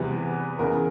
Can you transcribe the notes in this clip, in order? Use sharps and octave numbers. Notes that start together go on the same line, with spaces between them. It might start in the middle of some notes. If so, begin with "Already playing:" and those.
Already playing: E2 C3 E3 G3 B3 B4
E2 C#3 E3 A#4